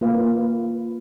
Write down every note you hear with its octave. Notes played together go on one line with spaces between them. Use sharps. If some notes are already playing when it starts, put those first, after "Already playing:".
A#3 F4 B4 F5